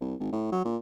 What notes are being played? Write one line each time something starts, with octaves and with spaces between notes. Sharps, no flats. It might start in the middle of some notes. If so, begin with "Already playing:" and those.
C2
G#1
A2
F#3
A#2